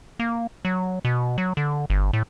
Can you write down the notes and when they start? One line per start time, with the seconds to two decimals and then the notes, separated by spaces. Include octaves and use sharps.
0.20 A#3
0.65 F#3
1.05 B2
1.38 F#3
1.57 D3
1.90 G1
2.13 A2